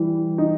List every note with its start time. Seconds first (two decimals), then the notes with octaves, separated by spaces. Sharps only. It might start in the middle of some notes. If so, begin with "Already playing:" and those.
Already playing: E3 G3
0.38 D#4